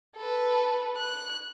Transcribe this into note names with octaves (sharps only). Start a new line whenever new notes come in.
A4 B4
F#6